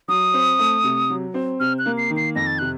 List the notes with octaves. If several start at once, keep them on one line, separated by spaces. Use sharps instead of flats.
F#3 D#6
C4
A3
C3
F#3
C4
C3 F6
F#6
A#3
C7
D#3
C7
F2 A#6
A6
C3 F#6